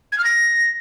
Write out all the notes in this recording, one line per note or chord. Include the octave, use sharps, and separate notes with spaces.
G#6
F6
A#6